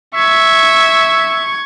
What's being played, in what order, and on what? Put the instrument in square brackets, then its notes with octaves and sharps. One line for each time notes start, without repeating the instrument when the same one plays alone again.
[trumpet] E5 [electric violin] C#6 G#6